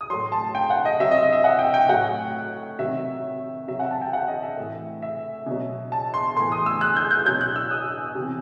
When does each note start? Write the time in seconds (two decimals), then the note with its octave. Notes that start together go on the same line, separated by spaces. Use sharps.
0.01 D#6
0.10 A2 F#3 C6
0.32 A5
0.55 G5
0.70 F#5
0.85 D#5
1.00 C3 F#3 E5
1.11 D#5
1.22 D#5
1.33 E5
1.44 F#5
1.59 G5
1.74 G5
1.89 A2 F#3 F#5
2.79 C3 D#3 F#3 E5
3.68 C3 F#3 E5
3.79 F#5
3.91 A5
4.02 G5
4.13 F#5
4.28 D#5
4.43 E5
4.57 A2 E3
5.02 E5
5.46 B2 F#3
5.92 A5
6.14 C6
6.37 A2 E3 C6
6.52 D#6
6.66 E6
6.81 F#6
6.96 G6
7.11 G6
7.26 B2 F#3 G6
7.41 F#6
7.56 E6
7.71 D#6
8.15 C3 E3